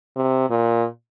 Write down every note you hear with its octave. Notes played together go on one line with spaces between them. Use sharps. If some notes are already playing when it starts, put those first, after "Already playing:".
C3
A#2